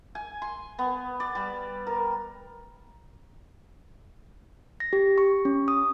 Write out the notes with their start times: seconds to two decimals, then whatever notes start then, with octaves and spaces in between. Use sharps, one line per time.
0.15 G#5
0.42 C6
0.79 B3
1.20 D5
1.35 G3
1.87 A#4
4.80 A#6
4.93 G4
5.18 C#6
5.45 C#4
5.68 D#6